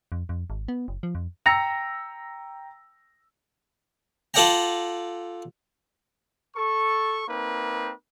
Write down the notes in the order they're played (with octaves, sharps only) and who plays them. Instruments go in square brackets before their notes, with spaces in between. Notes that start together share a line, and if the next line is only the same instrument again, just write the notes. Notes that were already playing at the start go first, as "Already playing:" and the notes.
[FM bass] F2
F2
G#1
B3
F#1
F3
F2
[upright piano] G5 A#5 E6 A#6 C#7 F7
[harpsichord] F4 A4 D5 F#5 G5 A#5
[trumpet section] A4 C#6
A#3 C4 D#4 B4